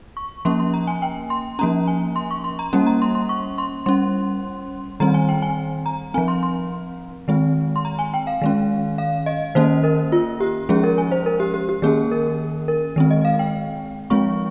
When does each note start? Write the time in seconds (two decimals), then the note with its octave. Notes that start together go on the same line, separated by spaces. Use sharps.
0.17 C#6
0.45 F3 A#3 C#4 C6
0.60 C6
0.74 A#5
0.87 G#5
1.02 G5
1.30 C6
1.59 F3 A#3 C#4 A#5
1.87 G#5
2.16 C6
2.31 C#6
2.44 C6
2.59 A#5
2.73 G3 A#3 C#4
2.86 A#5
3.02 C6
3.15 C6
3.29 C#6
3.58 C6
3.86 G3 C#4 C6
5.00 D#3 G3 C4 A#5
5.14 G#5
5.29 G5
5.42 G#5
5.86 A#5
6.14 F3 C4 G#5
6.28 C6
6.43 C6
7.28 D#3 G#3 C4
7.76 C6
7.85 A#5
7.99 G#5
8.14 G5
8.27 F5
8.41 D#3 G#3 C#4
8.98 F5
9.26 D#5
9.55 D#3 A#3 C#4 C5
9.83 A#4
10.12 F4
10.40 G4
10.69 F3 G#3 C#4 G#4
10.84 A#4
10.98 G#5
11.11 C5
11.26 A#4
11.40 G4
11.54 G4
11.69 G4
11.82 D#3 A#3 C#4 G#4
12.11 A#4
12.68 A#4
12.96 D#3 G#3 C4
13.11 D#5
13.25 F5
13.39 G5
14.10 F3 G#3 C4 C#6